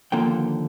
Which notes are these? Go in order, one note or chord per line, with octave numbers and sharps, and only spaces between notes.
D#2 D3 F3 A#3 G5